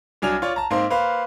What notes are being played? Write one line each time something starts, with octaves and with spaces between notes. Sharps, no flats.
C2 F#3 D4 G#5 F6 F7
F4 C#5 D5
A5 A#5
G#2 A#3 C4 C6
A#3 B4 C5 F5